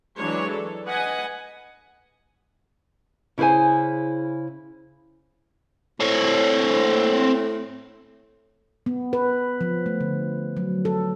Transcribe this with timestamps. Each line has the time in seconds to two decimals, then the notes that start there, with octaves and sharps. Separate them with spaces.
0.16 E3 F#3 G#3 D4 C#5
0.51 A4
0.86 B4 D#5 F#5 G#5
3.38 C#3 E4 G#4 C5 G#5
6.00 A2 C4 C#5
8.86 B3
9.13 B4
9.61 F3
9.86 A3
10.01 D3
10.57 F#3
10.85 A4